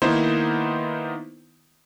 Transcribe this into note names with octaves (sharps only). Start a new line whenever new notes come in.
D#3 A#3 B3 D#4 E4 C5